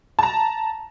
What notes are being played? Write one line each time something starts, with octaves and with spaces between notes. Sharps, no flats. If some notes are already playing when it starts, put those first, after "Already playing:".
A5 A#5